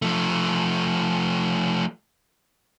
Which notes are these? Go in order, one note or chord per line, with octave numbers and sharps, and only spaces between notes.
F3 A3